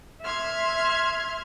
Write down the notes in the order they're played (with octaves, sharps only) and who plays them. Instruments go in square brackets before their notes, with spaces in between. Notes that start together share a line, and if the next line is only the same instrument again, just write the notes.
[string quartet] E5 C6 F6 G#6